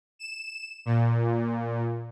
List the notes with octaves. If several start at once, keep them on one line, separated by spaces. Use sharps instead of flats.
E7
A#2